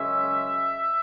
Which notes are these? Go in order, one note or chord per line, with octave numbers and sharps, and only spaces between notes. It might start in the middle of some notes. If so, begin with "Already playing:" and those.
Already playing: F#2 C#3 G#3 C#4 E5